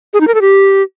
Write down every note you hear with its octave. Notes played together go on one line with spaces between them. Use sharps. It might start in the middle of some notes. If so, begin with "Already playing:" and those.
G#4
D#4
A#4
A4
G4